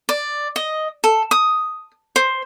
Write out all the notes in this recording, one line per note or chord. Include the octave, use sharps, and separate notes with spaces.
D5
D#5
A4
D#6
C5